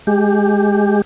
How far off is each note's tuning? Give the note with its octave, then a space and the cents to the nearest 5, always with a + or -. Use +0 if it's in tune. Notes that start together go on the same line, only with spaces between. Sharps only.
G#3 +0 G4 +15